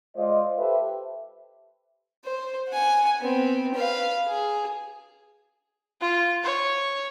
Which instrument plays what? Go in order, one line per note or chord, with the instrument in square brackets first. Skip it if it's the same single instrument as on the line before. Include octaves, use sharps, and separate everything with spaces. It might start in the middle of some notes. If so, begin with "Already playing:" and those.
[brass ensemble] G#3 F4 C5 D5 D#5
G4 A4 B4 C5 E5
[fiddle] C5
F#5 G#5
B3 C4
B4 F5
G#4
[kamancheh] F4
C#5